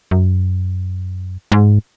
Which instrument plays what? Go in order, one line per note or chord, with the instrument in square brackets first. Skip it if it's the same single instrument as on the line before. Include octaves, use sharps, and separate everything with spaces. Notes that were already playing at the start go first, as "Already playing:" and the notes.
[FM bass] F#2
G#2